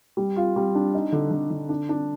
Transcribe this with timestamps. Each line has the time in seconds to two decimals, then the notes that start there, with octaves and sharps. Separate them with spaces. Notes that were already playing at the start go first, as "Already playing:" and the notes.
0.17 G3
0.36 F4
0.56 G3
0.75 D4
0.94 D#4
1.12 D3
1.31 D3
1.50 D3
1.69 D4
1.89 D4